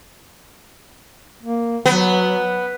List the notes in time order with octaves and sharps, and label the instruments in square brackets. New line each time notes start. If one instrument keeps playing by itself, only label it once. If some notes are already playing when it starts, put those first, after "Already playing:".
[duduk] A#3
[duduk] F#3 [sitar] B3